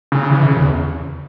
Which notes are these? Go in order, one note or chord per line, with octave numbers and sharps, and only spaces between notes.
C#3
E3
C#3
F#2
E2